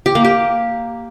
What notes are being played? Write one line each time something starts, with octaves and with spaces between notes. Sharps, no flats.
G4
A#3
G4